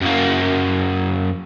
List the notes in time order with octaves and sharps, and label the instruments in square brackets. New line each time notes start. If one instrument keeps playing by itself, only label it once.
[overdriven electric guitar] F#2 A#3